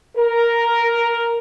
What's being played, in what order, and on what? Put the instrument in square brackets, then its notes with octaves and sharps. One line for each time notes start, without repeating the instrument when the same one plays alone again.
[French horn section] A#4